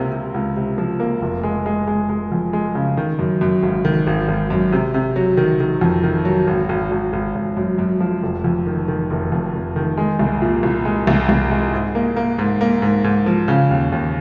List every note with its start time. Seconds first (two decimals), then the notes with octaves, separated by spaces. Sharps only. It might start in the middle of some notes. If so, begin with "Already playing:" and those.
Already playing: C#2 C3 A#3
0.12 C3
0.34 C#2
0.56 C3
0.78 F3
1.00 A#3
1.21 F1
1.43 G#3
1.66 G#3
1.87 G#3
2.09 G#3
2.32 F2
2.53 G#3
2.75 C#3
2.97 D#3
3.19 F#2
3.41 F#2
3.63 G#1
3.85 D#3
4.07 G#1
4.28 G#1
4.50 F#2
4.72 C3
4.94 C3
5.16 F#3
5.37 D#3
5.60 D#3
5.81 F2
6.03 D#3
6.25 F#3
6.47 G#1
6.69 G#1
6.92 G#1
7.13 G#1
7.35 G#1
7.57 F#2
7.78 F#2
8.00 F3
8.23 F1
8.44 F2
8.67 D#3
8.88 D#3
9.10 F1
9.32 F2
9.54 F1
9.76 D#3
9.98 G#3
10.19 C2
10.42 A#2
10.63 C2
10.85 G#3
11.07 C2
11.29 C2
11.51 G#3
11.73 G#2
11.95 A#3
12.17 A#3
12.39 G#2
12.61 A#3
12.82 G#2
13.04 G#2
13.26 F3
13.48 C#3
13.71 D#2
13.92 D#2